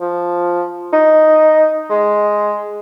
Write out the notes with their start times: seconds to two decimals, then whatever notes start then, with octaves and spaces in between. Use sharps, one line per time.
0.01 F3
0.93 D#4
1.90 G#3